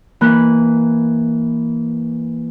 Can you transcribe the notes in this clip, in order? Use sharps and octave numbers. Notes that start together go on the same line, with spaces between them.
E3 A#3 B5 F#6